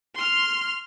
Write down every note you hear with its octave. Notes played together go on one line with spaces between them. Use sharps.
C6 F6